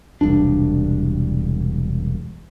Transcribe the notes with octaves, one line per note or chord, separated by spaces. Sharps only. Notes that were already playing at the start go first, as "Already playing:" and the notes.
E1 C2 D4